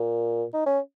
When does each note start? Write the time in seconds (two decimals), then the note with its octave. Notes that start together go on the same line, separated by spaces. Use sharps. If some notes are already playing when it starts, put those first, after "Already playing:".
Already playing: A#2
0.54 D#4
0.66 C#4